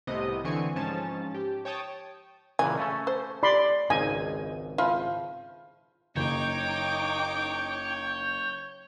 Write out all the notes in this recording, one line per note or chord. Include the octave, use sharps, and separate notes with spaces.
C2 A2 C3 B3 D#5 D#6
D3 E3 C4 G#5 C#6 C#7
G#2 F3 C#4 A5 A6
G4
C#5 G5 A5 D#6
A#2 C#3 E3 G#5
A3 C#4 A4
C5
D5 B5 C6
G#1 C#2 D#4 G#5
F3 E4 F4
F#1 D#4 C#5 G5 D6 G6